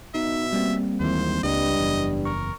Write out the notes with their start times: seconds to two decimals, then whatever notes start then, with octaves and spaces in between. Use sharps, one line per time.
0.15 B2 D#4 E5
0.53 G3 A#3 C4
1.00 G#1 D#2 E3 C5
1.43 C#2 G2 D#5
1.79 F#1 E2
2.25 A#4 C#6